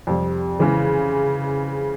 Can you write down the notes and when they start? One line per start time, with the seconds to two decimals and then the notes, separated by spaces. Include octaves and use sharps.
0.07 F2 C3 G3
0.59 C#3 E3 G#3